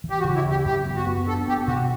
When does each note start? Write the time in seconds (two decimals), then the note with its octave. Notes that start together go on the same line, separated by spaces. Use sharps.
0.04 E3
0.10 G4
0.19 F#4
0.24 C#3
0.35 E4
0.45 D2
0.50 G4
0.65 F#2 G4
0.85 B3
0.96 F#4
1.06 B3
1.27 D4 A4
1.48 B3 G4
1.67 B2 F#4